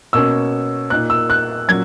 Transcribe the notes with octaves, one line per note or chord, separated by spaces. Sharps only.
B2 A#3 C#4 E6
A#2 A#3 D#4 F#6
E6
F#6
A#2 F#3 C#4 G#6